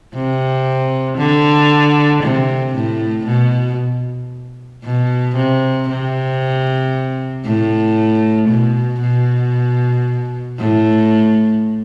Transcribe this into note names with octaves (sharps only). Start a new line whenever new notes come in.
C3
D3
C3
A2
B2
B2
C3
C3
A2
B2
B2
A2